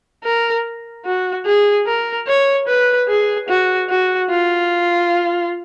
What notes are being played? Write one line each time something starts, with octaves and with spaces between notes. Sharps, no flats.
A#4
F#4
G#4
A#4
C#5
B4
G#4
F#4
F#4
F4